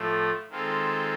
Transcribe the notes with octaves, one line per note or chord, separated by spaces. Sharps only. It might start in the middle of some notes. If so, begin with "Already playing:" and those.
Already playing: A2 F3 A3
D#3 G#3 C4 F4 A4